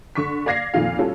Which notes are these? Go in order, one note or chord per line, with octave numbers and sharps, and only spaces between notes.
D3 C#6 B6
D5 F5 G#6 A#6 C7
F2 A#2 D#3 F4 F5
G3 C#4 F4 F#4 A4